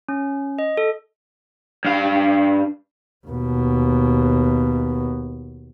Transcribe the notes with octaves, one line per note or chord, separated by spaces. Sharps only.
C#4
D#5
A4
G2 F5
D#2 B2